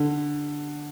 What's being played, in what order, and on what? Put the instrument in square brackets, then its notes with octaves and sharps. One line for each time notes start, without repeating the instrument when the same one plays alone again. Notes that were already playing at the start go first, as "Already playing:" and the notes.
Already playing: [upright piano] D3